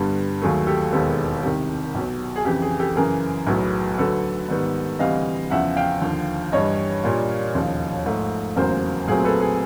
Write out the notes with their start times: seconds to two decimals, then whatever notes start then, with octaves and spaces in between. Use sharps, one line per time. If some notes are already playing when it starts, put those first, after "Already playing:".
Already playing: G2 D3 G3 B3
0.41 D#2 D#3 F#3 A3 G#4
0.67 G4 A4
0.92 E1 D#2 D#3 G#3 B3 G4 A4
1.43 C2 C3 D#3 G4
1.95 B1 B2 F#3
2.36 G#4
2.45 F2 C#3 E3 G4
2.62 G#4
2.79 G4 A4
2.96 F#2 C#3 E3 G#4 A#4
3.47 B1 A2 F#3 B3
3.98 D2 D3 F#3 A4 B4
4.48 G#2 D#3 G3 B3
4.99 D2 C3 E3 G3 D#5 F5
5.50 E2 C#3 F3 E5 F#5
5.76 F5 G5
6.02 D#2 D3 F3
6.52 G2 E3 G3 C#5 D#5
7.03 A#2 G3 A#3 D4 F4
7.55 E1 D#2 C#3 F3
8.06 G#2 F3 A3
8.56 F1 E2 C#3 F#3 A#3 A#4 C5
9.08 B1 A#2 F#3 A3 C4 G#4 A#4
9.25 A4 B4
9.41 G#4